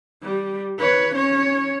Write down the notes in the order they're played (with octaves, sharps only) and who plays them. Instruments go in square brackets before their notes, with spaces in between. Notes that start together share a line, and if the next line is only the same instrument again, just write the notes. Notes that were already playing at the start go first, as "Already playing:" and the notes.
[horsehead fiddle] G3
B4 C#5
C#4 C#5